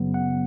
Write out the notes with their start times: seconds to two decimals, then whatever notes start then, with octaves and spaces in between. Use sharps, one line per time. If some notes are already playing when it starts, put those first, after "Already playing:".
Already playing: F#2 C#3 F#3 B3
0.14 F#5